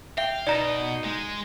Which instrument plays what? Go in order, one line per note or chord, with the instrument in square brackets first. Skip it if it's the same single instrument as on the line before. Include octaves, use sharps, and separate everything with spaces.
[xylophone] E5 [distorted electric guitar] F5 [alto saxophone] G5
[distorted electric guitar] B2 [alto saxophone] D#4 [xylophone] D5 A#5 A#6
[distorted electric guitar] G#3